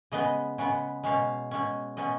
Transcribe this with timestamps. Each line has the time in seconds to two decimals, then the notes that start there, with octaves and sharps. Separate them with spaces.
0.12 C#3 G#3 B3 D#5
0.58 C#3 G#3 B3
1.03 B2 G#3 C#4 F5
1.51 B2 G#3 C#4
1.97 B2 G#3 C#4 D#5